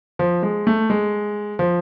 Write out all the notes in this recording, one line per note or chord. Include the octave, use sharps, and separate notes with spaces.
F3
G#3
A3
G#3
F3